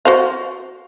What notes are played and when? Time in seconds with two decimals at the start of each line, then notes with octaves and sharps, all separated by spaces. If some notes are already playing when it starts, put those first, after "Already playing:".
0.05 F#4 C5 F5